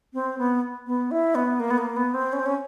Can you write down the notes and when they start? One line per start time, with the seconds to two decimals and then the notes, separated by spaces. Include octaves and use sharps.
0.14 C4
0.38 B3
0.87 B3
1.11 E4
1.35 B3
1.60 A#3
1.71 B3
1.78 A#3
1.96 B3
2.14 C4
2.33 C#4
2.40 C4
2.46 C#4